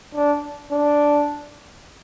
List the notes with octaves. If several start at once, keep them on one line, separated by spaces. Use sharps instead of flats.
D4
D4